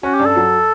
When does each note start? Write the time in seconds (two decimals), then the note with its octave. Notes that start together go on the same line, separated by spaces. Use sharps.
0.03 C#4 F#4
0.15 G4
0.19 G2
0.25 A4
0.36 F#3